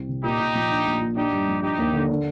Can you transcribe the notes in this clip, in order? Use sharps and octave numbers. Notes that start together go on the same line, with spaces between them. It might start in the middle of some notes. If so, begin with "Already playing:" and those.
Already playing: C2 C4
C3
A#2 D#4 G4
A#2
F3
D4
A#1
A#2
D4 D#4 G4
G2
F3
D4 D#4 G4
D#2
D3
D4